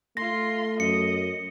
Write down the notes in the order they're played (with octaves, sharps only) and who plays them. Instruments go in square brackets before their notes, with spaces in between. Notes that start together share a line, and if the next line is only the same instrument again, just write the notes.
[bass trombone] A3 [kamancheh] F4 C6 [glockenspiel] A#6
[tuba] F#2 [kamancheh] D#5 [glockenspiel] C#7